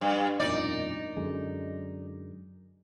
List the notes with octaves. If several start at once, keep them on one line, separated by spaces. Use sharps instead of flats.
G2
E1 F#2 A#2 D#4 D5
F#2 D3 G#3